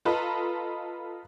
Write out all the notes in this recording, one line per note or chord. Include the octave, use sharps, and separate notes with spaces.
F4 A4 B4 D#5 A5 A#5